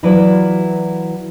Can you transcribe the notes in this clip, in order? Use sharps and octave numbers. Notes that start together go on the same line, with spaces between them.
E3 F#3 E4 F4 B4 D5